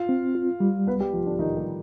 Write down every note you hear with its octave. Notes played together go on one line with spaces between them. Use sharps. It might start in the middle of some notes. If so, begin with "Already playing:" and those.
Already playing: F4 F5
C4
F4
G3
C2 B3 B4
G3 G4
C2 F3 F4
D3 D4
C2 D#3 D#4
G3 G4